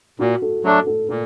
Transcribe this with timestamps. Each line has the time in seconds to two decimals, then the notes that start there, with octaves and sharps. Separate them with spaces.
0.19 A#2 F#4
0.42 A4
0.64 F#3 A3 D4 A4
0.87 A4
1.09 A#2 A4